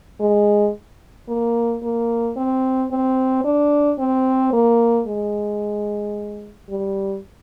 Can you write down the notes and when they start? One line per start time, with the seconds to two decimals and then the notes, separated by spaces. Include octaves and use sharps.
0.20 G#3
1.28 A#3
1.83 A#3
2.37 C4
2.91 C4
3.44 D4
3.99 C4
4.53 A#3
5.07 G#3
6.69 G3